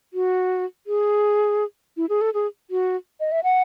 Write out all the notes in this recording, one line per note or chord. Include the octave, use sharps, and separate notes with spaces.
F#4
G#4
E4
G#4
A4
G#4
F#4
D#5
E5
F#5